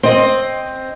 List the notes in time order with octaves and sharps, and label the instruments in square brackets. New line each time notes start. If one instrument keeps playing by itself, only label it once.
[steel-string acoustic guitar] C4 D#5